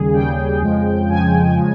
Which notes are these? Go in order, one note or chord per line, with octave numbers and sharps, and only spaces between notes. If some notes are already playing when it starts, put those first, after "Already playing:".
Already playing: D#2 C#3 G3 G#4
D#2 C#3 G3 G5
F2 C#3 F3 G#3
F2 C#3 F3 G#3 G#5
C#3 F3 G#3